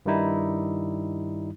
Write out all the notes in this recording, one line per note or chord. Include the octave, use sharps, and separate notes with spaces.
G2 D#3 G3 D#4 E4